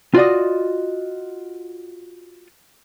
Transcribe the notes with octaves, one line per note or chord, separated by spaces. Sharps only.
F4 F#4 D5 D#5